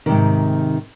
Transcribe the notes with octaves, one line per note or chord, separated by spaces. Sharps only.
G#2 C3 D#3